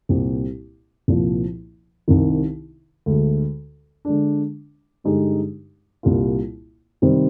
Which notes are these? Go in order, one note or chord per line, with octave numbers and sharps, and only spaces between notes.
C2 A#2 G3 C4 G4
C2 A#2 F3
C2 C3 D#3
D2 D3 G#3
D3 G#3 D4
G2 D3 G#3 D#4 G4
C2 A#2 G3 A#3 F4
C3 D#3 G3 C4